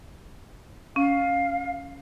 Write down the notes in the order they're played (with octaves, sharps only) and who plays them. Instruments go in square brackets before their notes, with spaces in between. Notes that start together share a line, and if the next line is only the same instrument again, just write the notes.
[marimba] C#4 [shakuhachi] F5